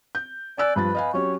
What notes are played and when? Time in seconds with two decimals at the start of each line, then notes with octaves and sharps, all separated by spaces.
0.15 G6
0.58 D5 G#5 E6 F#6
0.76 G2 F3 B4 A6
0.95 D#5 F5 G#5
1.14 F#3 C#4 G4 C#5